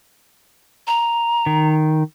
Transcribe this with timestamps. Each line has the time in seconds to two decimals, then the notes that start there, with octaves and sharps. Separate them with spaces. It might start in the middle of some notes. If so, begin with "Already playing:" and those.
0.87 A#5
1.46 D#3